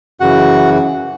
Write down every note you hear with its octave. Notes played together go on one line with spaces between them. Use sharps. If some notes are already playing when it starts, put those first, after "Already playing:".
F#2 C#3 E3 F#4 F#5